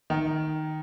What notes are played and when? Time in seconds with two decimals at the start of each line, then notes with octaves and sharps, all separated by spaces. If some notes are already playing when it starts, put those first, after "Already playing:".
0.10 D#3